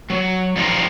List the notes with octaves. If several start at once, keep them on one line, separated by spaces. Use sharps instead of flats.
F#3
F3 G3 D#4 A#4 C5